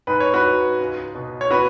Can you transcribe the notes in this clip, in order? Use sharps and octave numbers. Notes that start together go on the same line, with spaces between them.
G#2 B4
C#5
F#4 B4
G#2
C#2
B2
C#5
B3 F#4 B4